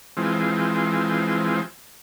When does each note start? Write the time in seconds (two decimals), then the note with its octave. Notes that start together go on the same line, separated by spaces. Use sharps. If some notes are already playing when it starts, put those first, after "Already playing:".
0.17 E3 F3 G#3 C4